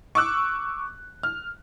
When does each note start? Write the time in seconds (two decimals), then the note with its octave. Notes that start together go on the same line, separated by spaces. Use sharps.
0.15 C#6 D6 E6 F#6
1.23 F6